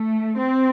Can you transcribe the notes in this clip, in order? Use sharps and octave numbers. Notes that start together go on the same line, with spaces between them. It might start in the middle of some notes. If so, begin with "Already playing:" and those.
Already playing: A3
C4